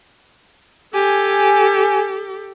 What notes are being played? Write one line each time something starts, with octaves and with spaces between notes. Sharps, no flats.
G4 A4 G#5